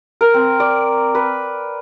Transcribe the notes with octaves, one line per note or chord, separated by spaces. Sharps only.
A#4
C4
D5
B4